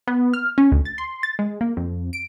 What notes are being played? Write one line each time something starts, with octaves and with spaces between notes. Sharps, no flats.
B3
F6
C#4
D2
A6
C6
A6
G#3
A#3
F2
D7